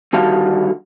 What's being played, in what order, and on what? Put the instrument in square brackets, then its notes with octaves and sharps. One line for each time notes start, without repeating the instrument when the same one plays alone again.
[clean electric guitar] D3 D#3 G3 F#4 F5 A5